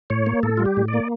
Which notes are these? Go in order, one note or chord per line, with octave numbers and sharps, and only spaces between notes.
A2 C#5
A#3
A2 A4
G3 F4
G4
A2
D5
A#3